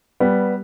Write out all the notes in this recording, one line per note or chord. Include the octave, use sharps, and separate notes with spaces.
G3 B3